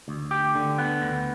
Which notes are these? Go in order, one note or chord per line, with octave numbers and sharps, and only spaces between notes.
D2
G4
D3
B3
D2